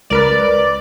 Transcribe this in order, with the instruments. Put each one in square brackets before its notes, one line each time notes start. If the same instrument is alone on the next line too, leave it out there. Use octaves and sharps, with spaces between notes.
[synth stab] C#2 A#4 B4 [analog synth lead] D5